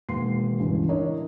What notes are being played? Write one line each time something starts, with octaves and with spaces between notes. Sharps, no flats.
E1 D#3 A#3 C6 C7
C#2 G2 C#3 E3
D4 E4 A#4 C#5 D#5